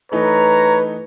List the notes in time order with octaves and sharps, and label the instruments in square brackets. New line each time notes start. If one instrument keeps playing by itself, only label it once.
[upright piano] E3 A3 D#4 [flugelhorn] B4 [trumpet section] C#5 A#5